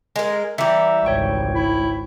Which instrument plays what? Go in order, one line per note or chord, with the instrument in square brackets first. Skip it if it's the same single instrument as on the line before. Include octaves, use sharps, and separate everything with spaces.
[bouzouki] G#3 A#4
[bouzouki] E3 G3 [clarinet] E5 [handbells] A#5 D6 C#7
[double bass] G#1 C#2 [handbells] C#5 G5 C#6
[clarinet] E4